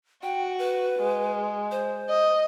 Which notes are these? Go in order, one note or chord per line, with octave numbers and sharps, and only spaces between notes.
F#4 G5
B4
G#3
C5
D#5